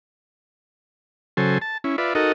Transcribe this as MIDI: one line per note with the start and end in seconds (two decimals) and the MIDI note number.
1.37 1.58 49
1.37 1.58 54
1.37 1.58 69
1.37 1.58 72
1.37 1.58 80
1.62 1.78 81
1.84 1.96 61
1.84 1.96 64
1.98 2.14 65
1.98 2.14 71
1.98 2.14 74
1.98 2.14 76
2.15 2.32 63
2.15 2.32 66
2.15 2.32 69
2.15 2.32 70
2.15 2.32 75